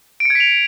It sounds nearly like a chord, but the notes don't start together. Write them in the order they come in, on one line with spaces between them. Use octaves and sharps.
D7 C#7 G#6 B6 F7